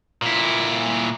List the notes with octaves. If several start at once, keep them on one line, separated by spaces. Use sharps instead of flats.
A#2 E4